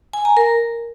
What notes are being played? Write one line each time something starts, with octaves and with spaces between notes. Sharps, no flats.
G#5
A#5
A#4